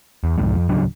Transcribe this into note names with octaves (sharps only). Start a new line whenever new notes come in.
E2
C2 F2 G#2
F2
D1 C#3 F#3 D4